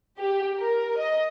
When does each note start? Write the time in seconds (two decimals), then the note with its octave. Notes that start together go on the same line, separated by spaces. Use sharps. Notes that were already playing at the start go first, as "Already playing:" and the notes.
0.19 G4
0.59 A#4
0.98 D#5